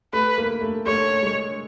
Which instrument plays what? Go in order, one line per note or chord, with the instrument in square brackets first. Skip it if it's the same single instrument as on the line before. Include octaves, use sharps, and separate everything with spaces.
[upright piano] A3 [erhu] B4
[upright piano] A#3
A3
[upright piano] A3 [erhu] C#5
[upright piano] G#3